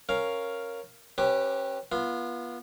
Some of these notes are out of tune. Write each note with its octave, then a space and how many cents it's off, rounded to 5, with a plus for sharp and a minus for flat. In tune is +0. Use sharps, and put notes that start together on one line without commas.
C#4 +0 A#4 +0 F5 +0
C#4 -30 G4 +0 B4 +0
B3 -30 F4 -20